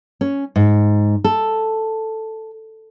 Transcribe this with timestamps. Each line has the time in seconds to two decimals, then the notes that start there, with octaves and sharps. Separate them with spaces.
0.21 C#4
0.56 G#2
1.24 A4